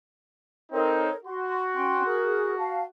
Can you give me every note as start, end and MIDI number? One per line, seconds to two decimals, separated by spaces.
0.72 1.09 60
0.72 1.09 63
0.72 1.16 69
0.72 1.16 70
0.72 1.16 73
1.25 2.86 66
1.25 1.61 84
1.74 2.04 61
1.74 2.04 79
1.74 2.04 84
2.05 2.54 68
2.05 2.54 70
2.58 2.83 77
2.58 2.83 81